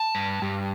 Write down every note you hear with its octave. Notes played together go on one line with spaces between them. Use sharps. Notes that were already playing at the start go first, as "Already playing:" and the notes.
Already playing: A5
G2
G2